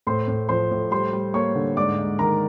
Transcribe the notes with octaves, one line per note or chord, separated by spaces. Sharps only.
A2 C5 C6
A2
F3 C5 C6
A2
G3 C5 C6
G3
A#3 C#5 C#6
D3
G#2 D5 D6
G#2
D#3 A#4 A#5